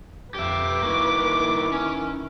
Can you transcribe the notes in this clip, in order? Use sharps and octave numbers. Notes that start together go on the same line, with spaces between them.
F2 G4 B4 E5 D6
D#3 A#3 E4 F#4
C#4